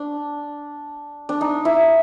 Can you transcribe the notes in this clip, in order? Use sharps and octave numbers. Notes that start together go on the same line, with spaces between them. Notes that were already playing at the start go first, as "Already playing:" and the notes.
Already playing: D4
D4
D#4
E4